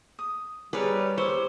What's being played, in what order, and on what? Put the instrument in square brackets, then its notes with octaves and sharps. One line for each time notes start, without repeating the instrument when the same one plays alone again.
[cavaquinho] D#6
[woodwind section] G3 [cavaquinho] G#4 A#4 D5 [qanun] B4 C#5
[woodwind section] E2 G4 E6 [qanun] C5 [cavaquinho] C#5 D6